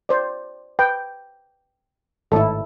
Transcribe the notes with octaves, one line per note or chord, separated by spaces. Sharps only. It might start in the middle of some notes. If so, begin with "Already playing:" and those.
C5 D5
B4 G5
G#1 A2 E4 A4